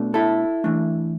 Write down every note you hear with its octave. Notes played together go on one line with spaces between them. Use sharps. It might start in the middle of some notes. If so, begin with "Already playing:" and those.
Already playing: B2 A3 D4
E4 A4
E3 A3 D4